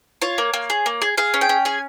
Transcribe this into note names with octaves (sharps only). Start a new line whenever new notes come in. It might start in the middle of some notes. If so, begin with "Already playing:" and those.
F4 C#5
A#3
A#3
G#4
A#3
G#4
G#4 F5
C#4
G5
C#4
G#4 G#5